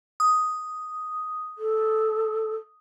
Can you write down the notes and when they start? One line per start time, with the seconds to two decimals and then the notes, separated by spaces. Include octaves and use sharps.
0.20 D#6
1.58 A4